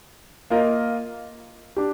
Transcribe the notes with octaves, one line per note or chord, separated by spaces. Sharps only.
A#3 F4 A#4 D#5
D4 G4